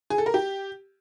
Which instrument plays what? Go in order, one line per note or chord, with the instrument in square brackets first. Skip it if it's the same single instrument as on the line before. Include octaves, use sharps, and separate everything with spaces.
[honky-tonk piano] G#4
A4
A#4
G4